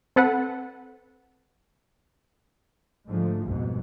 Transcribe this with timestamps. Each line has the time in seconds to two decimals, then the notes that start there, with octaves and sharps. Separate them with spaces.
0.16 C4 A4 B4 F#5
3.07 G#2 D3 F3 A3
3.45 C2 F2 G#2 B2